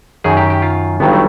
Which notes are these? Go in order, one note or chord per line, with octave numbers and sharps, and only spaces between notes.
F#2 D#3 F#3 G#4
G4
G4
F4
G1 G2 D#3 F#3 B3
A3